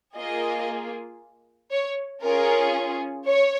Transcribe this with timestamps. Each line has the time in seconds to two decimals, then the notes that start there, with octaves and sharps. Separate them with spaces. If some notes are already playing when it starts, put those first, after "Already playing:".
0.16 A#3 F4 G#4 D#5
1.71 C#5
2.22 C#4 F4 G#4 A#4
3.26 C#5